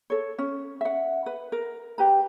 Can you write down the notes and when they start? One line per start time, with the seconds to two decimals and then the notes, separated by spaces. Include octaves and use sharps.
0.10 A4 C#5
0.38 C#4
0.81 E5 F#5
1.26 B4
1.52 A#4
1.98 G4 B4 A#5